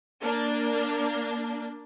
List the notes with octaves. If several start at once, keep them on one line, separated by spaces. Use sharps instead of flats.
A#3 D4